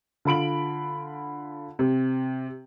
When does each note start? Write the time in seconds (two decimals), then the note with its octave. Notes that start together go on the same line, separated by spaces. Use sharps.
0.25 D3 F4 B5 D7 F#7
1.79 C3